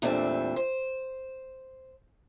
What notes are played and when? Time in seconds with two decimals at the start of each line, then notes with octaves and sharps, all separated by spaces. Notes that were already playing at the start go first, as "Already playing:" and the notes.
0.02 E2 A#2 G3 A3 C4 D4
0.56 C5